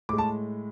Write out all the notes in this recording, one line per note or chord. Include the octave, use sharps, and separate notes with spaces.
A2 G#3 D6
A5